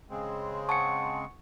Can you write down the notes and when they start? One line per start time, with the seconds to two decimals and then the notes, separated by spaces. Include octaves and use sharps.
0.10 C#3 G#3 C4
0.69 F#5 G#5 A5 C#6 C#7